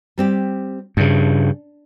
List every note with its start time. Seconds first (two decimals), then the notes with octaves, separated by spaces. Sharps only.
0.18 G3 C4 G4
0.97 G2 C#3 D4